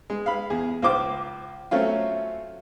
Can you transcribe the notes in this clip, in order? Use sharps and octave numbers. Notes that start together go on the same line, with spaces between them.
G#3
F5 B5
E2 G#4
C#2 F4 C5 D6
F#3 A3 C4 C#4 F4